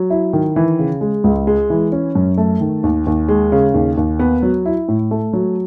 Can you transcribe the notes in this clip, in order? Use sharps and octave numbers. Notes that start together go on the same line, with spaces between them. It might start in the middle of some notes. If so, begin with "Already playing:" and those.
Already playing: F#3
E4
D#3
E3
C#3
G#3
C#2
G#3
E3
C#4
F#2
A3
D#3
D#2
D#2
G#3
C#3
D#2
D#2
B3
F#3
E4
A2
A3
F#3